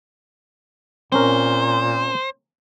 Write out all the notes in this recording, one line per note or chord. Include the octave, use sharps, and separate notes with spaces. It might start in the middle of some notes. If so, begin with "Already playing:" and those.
A#2 C4 C#4 A#4 C5